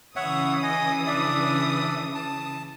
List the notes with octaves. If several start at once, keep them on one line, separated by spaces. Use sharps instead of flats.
C#3 E3 C#5 E5 F#5 D#6
D#5 G#5
D4 D5 E5
A5